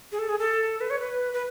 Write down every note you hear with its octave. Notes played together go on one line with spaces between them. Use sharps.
G#4
A4
G#4
A4
B4
C#5
B4
B4